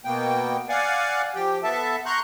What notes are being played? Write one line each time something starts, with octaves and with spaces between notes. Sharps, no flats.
B2 A#3 B3 G5
D5 F5 F#5 G#5
F3 G4 G5
B3 A4 E5 A5
A#5 C6 C#6 F#6 G6